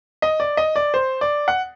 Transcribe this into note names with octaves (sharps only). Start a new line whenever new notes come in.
D#5
D5
D#5
D5
C5
D5
F#5